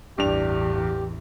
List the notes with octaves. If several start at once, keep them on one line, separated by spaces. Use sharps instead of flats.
A1 E2 G2 D4 G4 F7